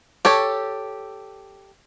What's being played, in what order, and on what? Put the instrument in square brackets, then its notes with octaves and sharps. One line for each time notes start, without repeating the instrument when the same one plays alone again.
[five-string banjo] G4 A4 C#5